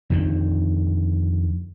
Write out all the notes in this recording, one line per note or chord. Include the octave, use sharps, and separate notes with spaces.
F2 D3 D#3